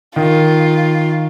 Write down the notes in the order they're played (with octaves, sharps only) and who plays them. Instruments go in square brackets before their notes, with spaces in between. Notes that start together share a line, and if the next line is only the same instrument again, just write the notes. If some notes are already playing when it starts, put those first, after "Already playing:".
[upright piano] D#3 [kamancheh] F4